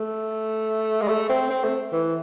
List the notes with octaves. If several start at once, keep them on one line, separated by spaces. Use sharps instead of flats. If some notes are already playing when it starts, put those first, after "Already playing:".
Already playing: A3
G#3
A3
C4
C4
A3
E3